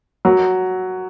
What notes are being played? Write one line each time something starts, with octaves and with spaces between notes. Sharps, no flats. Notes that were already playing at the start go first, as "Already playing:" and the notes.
F#3